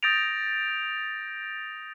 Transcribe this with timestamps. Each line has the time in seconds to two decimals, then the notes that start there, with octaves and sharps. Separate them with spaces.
0.03 D#6 G6 A6 A#6 D7 F7